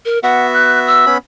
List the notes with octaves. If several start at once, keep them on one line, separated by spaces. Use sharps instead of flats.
A#4
B3 F#4 E5 F#5
F#6
E6
B3 C#4 B5